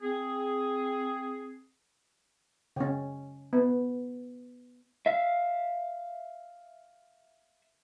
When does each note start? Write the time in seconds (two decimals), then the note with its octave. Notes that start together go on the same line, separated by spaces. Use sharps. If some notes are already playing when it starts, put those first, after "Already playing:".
0.02 C4 G#4
2.76 C#3 C#4
3.53 B3
5.06 E5 F5